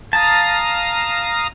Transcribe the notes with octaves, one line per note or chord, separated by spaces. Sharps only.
F5 A5 A#5 D#6